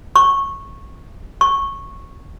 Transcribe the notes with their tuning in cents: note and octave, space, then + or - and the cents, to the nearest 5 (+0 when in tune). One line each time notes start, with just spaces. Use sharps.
C#6 -15
C#6 -10